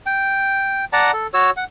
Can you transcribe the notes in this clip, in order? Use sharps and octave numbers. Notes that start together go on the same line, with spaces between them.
G5
D5 F#5 A5 A#5
A4
F#4 C#5 E6
F#5